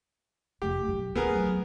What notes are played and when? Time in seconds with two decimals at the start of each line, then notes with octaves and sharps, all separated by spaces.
0.62 F1 A3 G4
0.88 B1 F#2
1.15 D1 D#3 B3 G#4 A#4
1.35 F#3 A3